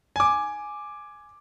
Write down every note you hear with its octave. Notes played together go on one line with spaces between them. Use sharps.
G#5 D6